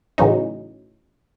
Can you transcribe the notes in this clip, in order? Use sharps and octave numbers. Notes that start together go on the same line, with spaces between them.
A2 C#3 E3 F#3 C#4 D#4